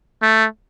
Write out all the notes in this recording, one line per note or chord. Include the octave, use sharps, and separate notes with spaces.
A3